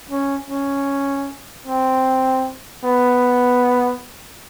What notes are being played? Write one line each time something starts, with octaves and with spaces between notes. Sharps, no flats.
C#4
C#4
C4
B3